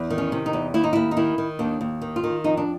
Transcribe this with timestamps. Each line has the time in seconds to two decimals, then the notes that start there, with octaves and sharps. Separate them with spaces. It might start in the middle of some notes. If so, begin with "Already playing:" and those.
Already playing: E2
0.10 D#3
0.18 C#4
0.32 C3
0.46 D#4
0.53 E2
0.74 D#2 E4
0.84 D#4
0.93 D#2 E4
1.11 D#4
1.17 D#3 E4
1.38 D#3
1.59 D#2 D4
1.81 D#2
2.02 D#3
2.16 F4
2.24 D#3
2.44 F2 D#4
2.57 D4